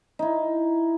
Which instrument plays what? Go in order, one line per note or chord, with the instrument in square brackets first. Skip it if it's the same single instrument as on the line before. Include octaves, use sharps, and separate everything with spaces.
[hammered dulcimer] D#4 E4